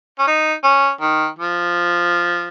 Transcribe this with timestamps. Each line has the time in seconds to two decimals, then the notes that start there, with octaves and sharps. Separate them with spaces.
0.19 C#4
0.27 D#4
0.63 C#4
1.01 D#3
1.39 F3